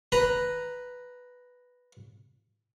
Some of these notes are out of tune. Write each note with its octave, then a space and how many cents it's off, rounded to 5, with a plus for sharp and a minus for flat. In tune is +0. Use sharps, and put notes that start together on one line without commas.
B4 +0 A#5 +0